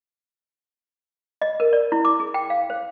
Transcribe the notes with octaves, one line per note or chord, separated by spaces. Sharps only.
D#5
A#4
D5
E4
D6
G#4
G5
F5
C5